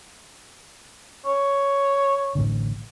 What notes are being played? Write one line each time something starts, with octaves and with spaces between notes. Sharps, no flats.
C#5
A1 A2 D3